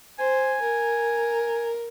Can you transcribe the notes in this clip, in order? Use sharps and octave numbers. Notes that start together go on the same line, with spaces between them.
C5 G#5
A#4